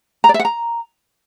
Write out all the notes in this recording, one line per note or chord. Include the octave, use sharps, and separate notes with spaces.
A#5
D5
E5
F#5
A#5